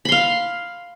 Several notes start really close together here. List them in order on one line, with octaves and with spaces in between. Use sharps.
B5 C6 F5